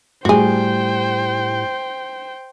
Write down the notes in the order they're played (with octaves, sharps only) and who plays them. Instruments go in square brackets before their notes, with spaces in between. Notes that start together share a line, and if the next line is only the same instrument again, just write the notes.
[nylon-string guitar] A2 G3 [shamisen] F#4 G#4 [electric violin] C5 G5